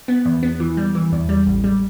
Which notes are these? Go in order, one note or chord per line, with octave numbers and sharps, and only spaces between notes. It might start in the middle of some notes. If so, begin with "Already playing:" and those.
B3
E2
B3
E3
G3
E3
E2
G3
A1
G3